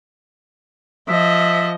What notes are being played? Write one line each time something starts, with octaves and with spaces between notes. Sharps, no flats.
F3 D#5 E5